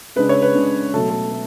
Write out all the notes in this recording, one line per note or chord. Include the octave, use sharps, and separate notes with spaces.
C#3 G#3 D4 B4
C#5
B4
C#3 G#3 D4
B2 F#3 A3 A4
A4
A3